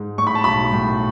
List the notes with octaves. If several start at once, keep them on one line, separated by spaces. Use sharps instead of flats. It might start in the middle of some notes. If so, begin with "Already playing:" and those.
Already playing: G#2
A2 C#6
B5
A5
B1 B5
A2